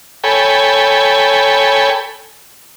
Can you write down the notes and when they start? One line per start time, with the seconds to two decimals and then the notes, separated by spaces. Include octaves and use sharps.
0.24 A4 C#5 G5 G#5 B5